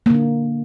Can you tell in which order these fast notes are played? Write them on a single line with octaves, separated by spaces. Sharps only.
A#3 D3 D4